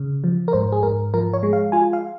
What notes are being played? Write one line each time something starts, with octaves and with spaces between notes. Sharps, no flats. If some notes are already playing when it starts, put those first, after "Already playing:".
Already playing: C#3
F3
A#4
G#2 C5
G#4
G#2 A#4
F3 A#4
C#5
G#3
F5
F4 G#5
F5